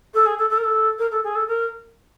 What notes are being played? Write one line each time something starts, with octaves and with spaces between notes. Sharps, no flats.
A4
G#4
A4
A4
A#4
A4
A#4
A4
G#4
A4
A#4